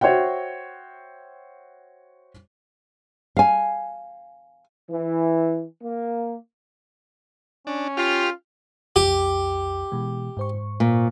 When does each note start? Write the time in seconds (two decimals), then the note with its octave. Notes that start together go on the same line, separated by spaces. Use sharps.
0.01 F#4 C5 C#5 E5 F#5 G5
3.37 F5 G#5
4.90 E3
5.82 A#3
7.67 C#4 D4
7.97 F4 G4 F6
8.96 B1 F2 G4
9.92 B2 E3 G#3
10.37 G#2 C5 C#6
10.80 A#2